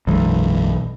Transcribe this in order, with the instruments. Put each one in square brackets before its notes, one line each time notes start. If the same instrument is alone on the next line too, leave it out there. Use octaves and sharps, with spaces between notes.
[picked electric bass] B1 [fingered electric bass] F#2 E3 G#3